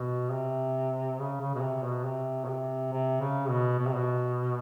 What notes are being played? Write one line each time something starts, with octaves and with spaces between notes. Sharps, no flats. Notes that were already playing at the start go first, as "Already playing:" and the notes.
Already playing: B2
C3
C#3
C#3
B2
C3
B2
C3
B2
C3
C3
C#3
B2
B2
C3
B2